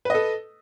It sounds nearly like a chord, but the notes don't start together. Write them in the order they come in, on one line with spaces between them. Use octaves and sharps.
B4 D#5 A4